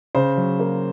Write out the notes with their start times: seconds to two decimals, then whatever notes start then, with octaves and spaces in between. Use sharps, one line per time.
0.15 C#3 C5
0.37 F#3
0.60 A#3